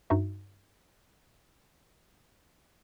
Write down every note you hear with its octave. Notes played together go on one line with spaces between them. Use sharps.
G2 D#4 F#4 E5